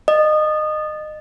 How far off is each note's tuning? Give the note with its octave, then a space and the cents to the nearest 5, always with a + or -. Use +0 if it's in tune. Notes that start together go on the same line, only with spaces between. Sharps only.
D#5 -25